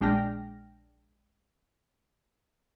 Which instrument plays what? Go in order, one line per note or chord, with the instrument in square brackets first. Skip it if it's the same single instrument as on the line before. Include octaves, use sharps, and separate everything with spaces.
[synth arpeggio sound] A#1 G#3 D4 G5 F6 A#6